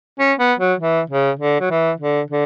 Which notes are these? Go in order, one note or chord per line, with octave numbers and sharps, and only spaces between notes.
C#4
B3
F#3
E3
C#3
D3
F#3
E3
D3
D3